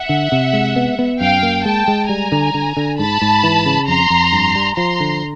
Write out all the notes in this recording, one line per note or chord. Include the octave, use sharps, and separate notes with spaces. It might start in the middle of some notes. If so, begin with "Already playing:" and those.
Already playing: E5 F#5
D3
C3
G#3
B3
B3
F#2 F5 G5
A#3
G#3 G5 A5
G#3
G3 G#5 A#5
D3
D3
D3
G#2 A5 B5
G#2
E3
C#3
F2 A#5 C6
F2
G2
G3
F3 A#5 C6
D3